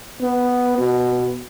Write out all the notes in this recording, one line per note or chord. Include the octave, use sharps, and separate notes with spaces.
B3
B2